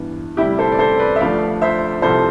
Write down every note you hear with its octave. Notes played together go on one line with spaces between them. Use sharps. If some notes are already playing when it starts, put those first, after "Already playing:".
Already playing: G2 E3 B3
D2 C3 G3 E4 G4
A4 C5
D5
A4 C5
B4 D5
E5
D2 D3 F3 A3 D5 F5
C5 E5
C2 C3 F3 A4 C5